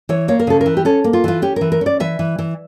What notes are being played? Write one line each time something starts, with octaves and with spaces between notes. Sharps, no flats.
E3 C#5
A#3 C#5
A#4
C#3 A4
A#4
E3
G4
C#4 A4
A#3
F4
E3 F4
C#4 G4
E3 A#4
A#4
C#4 D5
E3 E5
E3
E3